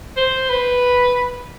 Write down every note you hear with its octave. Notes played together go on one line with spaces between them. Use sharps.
C5
B4